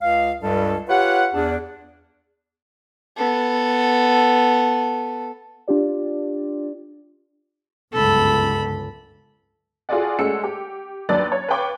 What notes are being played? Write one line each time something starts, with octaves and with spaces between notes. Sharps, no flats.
C#2 F5
C#2 G2 G3 A4
F4 G4 B4 C#5 F#5
E2 D4
B3 A4
D4 F4 G4 D5
G1 C#2 F#2 A4 B5
F4 F#4 G#4 A4 D5 F#5
G#3 A3 C#4 F#5 E6 C#7
G4
D#2 F#3 D4 B4 D5 A6
C#5
B4 C#5 F5 G5 C#6 D6